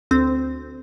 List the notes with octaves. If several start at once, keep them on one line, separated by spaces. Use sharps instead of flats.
D2 C4